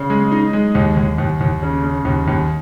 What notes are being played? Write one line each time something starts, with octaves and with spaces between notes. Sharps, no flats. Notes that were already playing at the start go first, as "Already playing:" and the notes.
Already playing: C#3
G#3
D#4
G#3
D#2
D#2
D#2
D#2
C#3
C#3
D#2
D#2